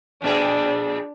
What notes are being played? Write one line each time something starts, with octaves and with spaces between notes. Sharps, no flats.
F2 A#2 D4 G#4